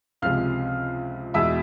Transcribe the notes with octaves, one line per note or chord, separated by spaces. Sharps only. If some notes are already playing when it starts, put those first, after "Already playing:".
C#2 C3 F3 G#3 F5 F6
E2 B2 G#3 E5 E6